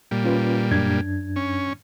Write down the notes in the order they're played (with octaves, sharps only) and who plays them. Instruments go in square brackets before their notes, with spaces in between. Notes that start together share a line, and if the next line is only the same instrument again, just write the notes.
[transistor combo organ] A#2 G3
[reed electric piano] C#4 F4 B4
F#2 D4 G#6
[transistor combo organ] C#4